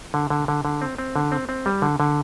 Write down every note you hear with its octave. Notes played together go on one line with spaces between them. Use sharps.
D3
D3
D3
D3
C4
C4
D3
C4
C4
G3
D3
D3